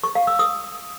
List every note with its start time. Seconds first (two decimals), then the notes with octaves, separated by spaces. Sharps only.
0.04 C#6
0.15 F5
0.27 E6
0.39 D#6